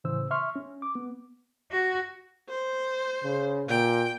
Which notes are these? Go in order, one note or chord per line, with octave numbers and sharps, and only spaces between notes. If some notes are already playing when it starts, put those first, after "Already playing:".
A2 C#3 E3 C5 E6
E5 C6 C#6 F6
C#4
D6
B3
F#4
C5
C#3
A#2 G5